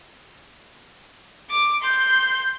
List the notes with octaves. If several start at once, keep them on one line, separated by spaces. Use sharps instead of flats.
D6
C6 G6